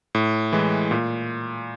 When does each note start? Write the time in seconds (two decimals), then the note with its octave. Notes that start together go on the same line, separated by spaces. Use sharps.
0.15 A2
0.53 E3 G#3
0.91 A#2